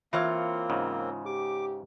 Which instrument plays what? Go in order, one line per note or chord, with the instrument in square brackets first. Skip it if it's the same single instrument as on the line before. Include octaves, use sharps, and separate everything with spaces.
[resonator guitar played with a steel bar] E3 F4 C#5 [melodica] A#3 C4
[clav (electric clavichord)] G#2 C#3
[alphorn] G4 [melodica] D6